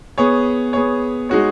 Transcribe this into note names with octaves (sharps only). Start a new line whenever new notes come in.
B3 G#4 C#5
B3 G#4 C#5
G#3 D#4 F#4 C#5